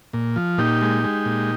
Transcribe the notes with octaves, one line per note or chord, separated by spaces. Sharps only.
A#2
F3
A#2 D#4 G4
G#3
G#3
A#2